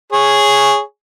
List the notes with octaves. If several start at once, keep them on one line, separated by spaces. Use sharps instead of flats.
G#4 C#5